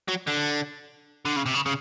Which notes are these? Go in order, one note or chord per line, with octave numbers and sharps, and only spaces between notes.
F#3
D3
D3
C#3
C3
C#3
C#3